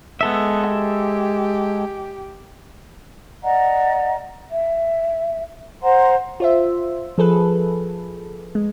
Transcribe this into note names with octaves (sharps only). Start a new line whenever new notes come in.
G#3 B3 A4 E5
G4
D5 D#5 F#5 A#5
E5
C5 F#5 A#5 C6
F4 C5 E5
F3 G#4 A4 B4
G#3